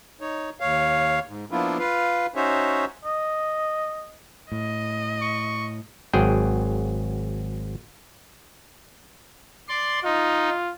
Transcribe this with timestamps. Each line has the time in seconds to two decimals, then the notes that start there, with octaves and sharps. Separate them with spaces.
0.21 D#4 C#5
0.60 D#2 C#5 F5
1.27 G#2
1.51 F3 A#3 B3 D4 E4 F4
1.79 F4 B4 F5
2.35 C#4 D#4 F#4 C5 C#5 E5
3.05 D#5
4.52 A2 D#5
5.22 C#6
6.13 G#1 F#3 G#4 G5
9.69 D5 C6
10.04 D#4 F4